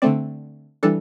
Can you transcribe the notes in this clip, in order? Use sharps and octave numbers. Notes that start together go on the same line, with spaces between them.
D3 A3 C4 D5
E3 G3 D4 A4